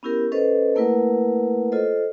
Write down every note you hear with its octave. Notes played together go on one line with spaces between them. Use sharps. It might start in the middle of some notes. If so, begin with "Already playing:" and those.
B3 C#4 E4 G4 A#4
C#4 A4 B4 C5 D#5
A3 A#3 E4 A#4 B4 F#5
F4 A4 C5 D#5